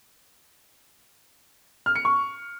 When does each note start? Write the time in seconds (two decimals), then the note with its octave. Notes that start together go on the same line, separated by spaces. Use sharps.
1.86 F6
1.95 C#7
2.05 C#6